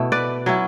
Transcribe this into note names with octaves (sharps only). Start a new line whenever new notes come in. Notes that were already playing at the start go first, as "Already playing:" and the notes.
Already playing: B2 A3 E4
B4 D5
F#3 C#4 E4